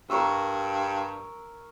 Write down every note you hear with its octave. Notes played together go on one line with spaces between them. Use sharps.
G2 A#4 C#6 E6